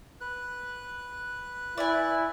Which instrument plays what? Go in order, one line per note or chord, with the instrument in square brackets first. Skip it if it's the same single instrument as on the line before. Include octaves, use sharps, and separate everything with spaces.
[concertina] B4 F#6
[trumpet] E4 [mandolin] D5 G#5 [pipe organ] E5